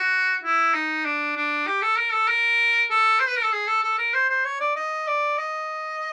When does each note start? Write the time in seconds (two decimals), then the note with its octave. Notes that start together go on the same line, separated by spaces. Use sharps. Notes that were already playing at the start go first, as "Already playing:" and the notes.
Already playing: F#4
0.43 E4
0.74 D#4
1.05 D4
1.36 D4
1.67 G4
1.82 A4
1.97 A#4
2.13 A4
2.28 A#4
2.90 A4
3.20 C5
3.27 B4
3.36 A#4
3.44 A4
3.52 G#4
3.67 A4
3.83 A4
3.98 A#4
4.13 C5
4.29 C5
4.45 C#5
4.60 D5
4.76 D#5
5.07 D5
5.38 D#5